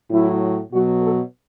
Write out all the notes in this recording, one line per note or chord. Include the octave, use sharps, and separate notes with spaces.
A2 F#3 E4
B2 F#3 F#4
A4